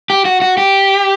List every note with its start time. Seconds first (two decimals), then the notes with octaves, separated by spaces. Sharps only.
0.10 G4
0.25 F#4
0.42 F#4
0.58 G4